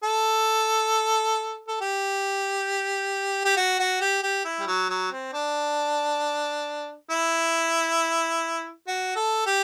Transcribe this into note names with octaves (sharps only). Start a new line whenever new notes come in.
A4
A4
G4
G4
F#4
F#4
G4
G4
E4
G3
F#3
F#3
C4
D4
E4
F#4
A4
G4